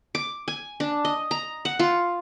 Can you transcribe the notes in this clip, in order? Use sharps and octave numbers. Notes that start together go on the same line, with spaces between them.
D6
G#5
D4
D#5
A#5
F#5
F4